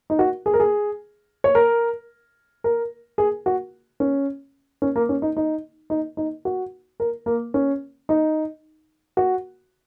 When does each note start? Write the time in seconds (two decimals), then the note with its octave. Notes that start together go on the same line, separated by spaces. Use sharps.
0.10 D#4
0.19 F#4
0.46 G#4
0.54 A#4
0.60 G#4
1.44 C#5
1.55 A#4
2.64 A#4
3.18 G#4
3.46 F#4
4.00 C#4
4.82 C#4
4.96 A#3
5.09 C#4
5.22 D#4
5.37 D#4
5.90 D#4
6.17 D#4
6.45 F#4
7.00 A#4
7.26 A#3
7.54 C#4
8.09 D#4
9.17 F#4